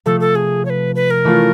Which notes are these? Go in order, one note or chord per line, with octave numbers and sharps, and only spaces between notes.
C3 F3 A3 A4
A4
G#4
C#5
B4
B4
A#4
E3 A3 C#4 F4